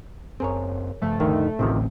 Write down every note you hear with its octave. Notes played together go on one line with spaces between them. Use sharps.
F#1 F#2 C4 G#4 A#4 C#5
G2 C#3 F3 A3
D2 D#3
A1 D2 C3 D#3 F3 C4